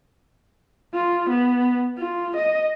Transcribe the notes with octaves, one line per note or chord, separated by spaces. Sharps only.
F4
B3
F4
D#5